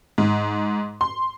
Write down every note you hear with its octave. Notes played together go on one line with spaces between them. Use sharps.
G#2
C6